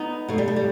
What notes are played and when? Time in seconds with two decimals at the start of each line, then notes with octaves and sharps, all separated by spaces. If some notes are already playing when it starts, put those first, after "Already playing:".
Already playing: B3 D#4
0.28 B2 A3
0.38 G3
0.48 A3
0.56 G3